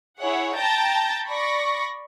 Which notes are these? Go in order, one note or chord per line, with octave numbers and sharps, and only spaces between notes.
E4 G#4 C#5 F#5
G5 A5 A#5 G6 A6 A#6
D5 B5 C#6 A#6